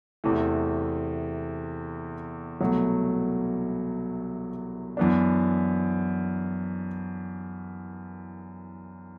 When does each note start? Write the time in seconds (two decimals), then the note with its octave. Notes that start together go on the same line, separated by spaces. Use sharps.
0.24 E2 C3 E3 A3
2.61 C2 B2 F#3 A3
4.97 F#2 E3 B3 D4